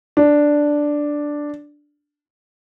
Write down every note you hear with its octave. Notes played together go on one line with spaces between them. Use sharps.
D4